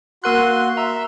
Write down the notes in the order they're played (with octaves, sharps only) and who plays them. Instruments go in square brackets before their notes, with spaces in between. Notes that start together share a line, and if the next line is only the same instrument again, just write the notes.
[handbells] A#3 A#4 F#6 [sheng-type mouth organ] F#4 C6
[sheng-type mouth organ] E5 [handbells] A#5